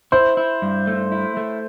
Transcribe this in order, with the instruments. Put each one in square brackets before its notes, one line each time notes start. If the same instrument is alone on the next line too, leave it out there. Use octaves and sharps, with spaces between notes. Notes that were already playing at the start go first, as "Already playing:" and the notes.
[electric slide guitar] E4 [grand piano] C5
[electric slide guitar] E4
G2
A3
E4
A3